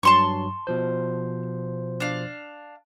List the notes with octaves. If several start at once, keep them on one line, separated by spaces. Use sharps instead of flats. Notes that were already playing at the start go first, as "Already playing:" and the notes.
G2 F#3 A5 C6 C#6
B2 F3 C5
D4 F5